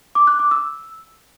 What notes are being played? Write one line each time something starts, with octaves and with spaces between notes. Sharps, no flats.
D6
F#6
D6
E6